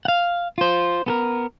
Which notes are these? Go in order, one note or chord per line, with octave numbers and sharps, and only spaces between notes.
F5 F#5
F4 C5
B3 A4 A#4